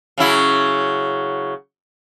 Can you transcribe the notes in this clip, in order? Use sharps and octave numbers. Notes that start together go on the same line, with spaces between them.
C#3 F#3 E4